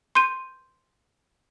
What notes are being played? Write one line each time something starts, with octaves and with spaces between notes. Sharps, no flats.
C6 G6 D#7